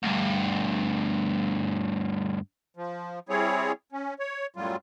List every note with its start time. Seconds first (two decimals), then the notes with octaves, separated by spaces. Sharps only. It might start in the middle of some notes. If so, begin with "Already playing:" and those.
0.03 D2 G2
2.77 F3
3.29 G3 C4 E4 G#4 C#5
3.92 C#4
4.19 C#5
4.56 F#2 A2 F#3 G3 F4